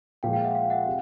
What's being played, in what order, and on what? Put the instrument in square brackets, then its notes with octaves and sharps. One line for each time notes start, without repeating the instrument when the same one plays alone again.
[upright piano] A#2 F3 G#3 [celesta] F5 G5
[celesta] F5 G5
E5 F#5
F5 G5
E5 F#5
[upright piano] C3